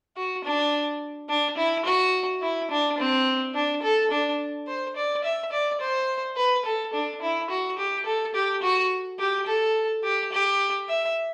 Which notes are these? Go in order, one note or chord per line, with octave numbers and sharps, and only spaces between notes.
F#4
D4
D4
E4
F#4
E4
D4
C4
D4
A4
D4
C5
D5
E5
D5
C5
B4
A4
D4
E4
F#4
G4
A4
G4
F#4
G4
A4
G4
G4
E5